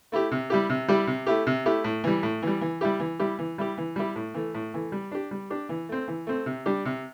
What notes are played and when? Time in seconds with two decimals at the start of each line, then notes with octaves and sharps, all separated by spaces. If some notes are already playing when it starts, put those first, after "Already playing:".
0.12 A3 E4 G4
0.31 C3
0.50 G3 E4 G4
0.69 C3
0.88 G3 E4 G4
1.07 C3
1.26 A3 E4 G4
1.47 C3
1.66 A3 E4 G4
1.84 A2
2.04 E3 G3
2.23 A2
2.43 E3 G3
2.61 E3
2.81 G3 E4 G4
3.00 E3
3.19 G3 E4 G4
3.39 E3
3.58 G3 E4 G4
3.78 E3
3.96 G3 E4 G4
4.16 A2
4.34 E3 A3
4.55 A2
4.74 E3 A3
4.92 G3
5.12 D4 G4
5.31 G3
5.50 D4 G4
5.69 E3
5.89 A3 C4
6.08 E3
6.27 A3 C4
6.46 C3
6.66 G3 D4 G4
6.85 C3